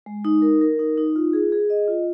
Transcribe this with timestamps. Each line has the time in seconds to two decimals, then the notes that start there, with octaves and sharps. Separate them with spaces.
0.06 G#3
0.25 D#4
0.42 A#4
0.61 A#4
0.79 D#4
0.97 D#4
1.16 F4
1.33 G#4
1.52 G#4
1.70 D#5
1.88 F4